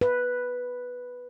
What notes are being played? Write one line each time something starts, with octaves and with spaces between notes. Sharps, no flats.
B4